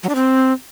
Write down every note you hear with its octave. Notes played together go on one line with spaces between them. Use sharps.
F#3
D4
C4